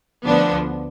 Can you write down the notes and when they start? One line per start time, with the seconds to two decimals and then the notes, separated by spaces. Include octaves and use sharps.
0.24 D2 D3 F3 B3 D4